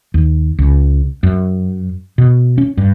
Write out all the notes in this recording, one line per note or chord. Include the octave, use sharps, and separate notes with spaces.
D#2
C#2
F#2
B2
C#4
G2